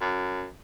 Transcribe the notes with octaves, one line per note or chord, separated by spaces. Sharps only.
F#2